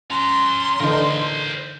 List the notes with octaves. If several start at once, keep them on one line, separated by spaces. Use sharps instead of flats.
C#4 A#5 C6
D3 E3 D#4 A#4 C5